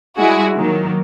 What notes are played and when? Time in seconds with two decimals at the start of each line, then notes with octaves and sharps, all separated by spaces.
0.18 G3 G#3 E4 F#4 G#4
0.56 D#3 F#3 A#3